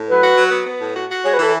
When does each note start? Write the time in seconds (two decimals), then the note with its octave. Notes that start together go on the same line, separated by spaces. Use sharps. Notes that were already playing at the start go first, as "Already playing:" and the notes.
Already playing: A2
0.09 F#3 B4
0.24 F#4
0.37 F#3
0.51 B3
0.67 B3
0.81 A2
0.95 F#4
1.10 F#4
1.24 G#3 C#5
1.33 B4
1.39 E3 A4